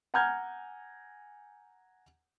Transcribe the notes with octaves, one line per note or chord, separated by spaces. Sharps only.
F#5 G#5 A#5 F6 G6 G#6